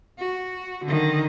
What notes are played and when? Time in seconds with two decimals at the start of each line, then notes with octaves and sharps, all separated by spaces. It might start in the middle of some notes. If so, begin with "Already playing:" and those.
0.19 F#4
0.85 D3 D#3